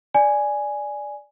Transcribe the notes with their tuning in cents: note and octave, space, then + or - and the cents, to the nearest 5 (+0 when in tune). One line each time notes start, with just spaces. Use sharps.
D5 +0 G#5 +0